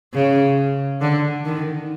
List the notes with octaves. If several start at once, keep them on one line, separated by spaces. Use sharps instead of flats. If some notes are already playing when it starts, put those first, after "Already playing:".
C#3
D3
D#3